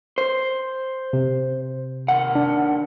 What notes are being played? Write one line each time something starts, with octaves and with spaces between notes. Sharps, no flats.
C5
C3
D#2 F#5
D4